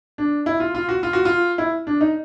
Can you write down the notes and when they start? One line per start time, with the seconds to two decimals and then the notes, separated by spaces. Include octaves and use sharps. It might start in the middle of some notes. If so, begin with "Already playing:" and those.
0.18 D4
0.46 E4
0.60 F4
0.75 F4
0.89 F#4
1.03 F4
1.13 F#4
1.25 F4
1.58 E4
1.87 D4
2.01 D#4